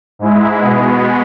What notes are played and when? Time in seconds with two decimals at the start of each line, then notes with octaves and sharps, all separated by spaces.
0.19 G#2 G#3 E4
0.58 B2 G#3 B3